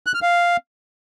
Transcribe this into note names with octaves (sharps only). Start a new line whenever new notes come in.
F#6
F6
F5